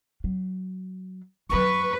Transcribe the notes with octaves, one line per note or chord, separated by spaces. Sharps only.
F#3
F#2 F#3 B4 C#6